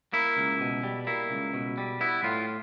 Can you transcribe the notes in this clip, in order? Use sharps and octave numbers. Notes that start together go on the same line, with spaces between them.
A#3 E4
C#2
B2
G3
A#3 E4
C#2
B2
G3
B3 E4
A2 F4